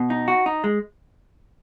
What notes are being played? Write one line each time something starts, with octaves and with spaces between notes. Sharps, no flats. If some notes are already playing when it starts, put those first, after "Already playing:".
Already playing: B2
D#4
F#4
D#4
G#3